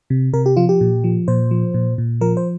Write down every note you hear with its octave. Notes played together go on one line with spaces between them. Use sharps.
C3
C3 A#4
G4
F3 F4
G4
A#2
F3
A#2 C5
F3
A#2
A#2
F3 A#4
C5